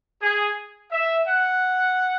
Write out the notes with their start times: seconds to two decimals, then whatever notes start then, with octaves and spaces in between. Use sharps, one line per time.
0.22 G#4
0.91 E5
1.27 F#5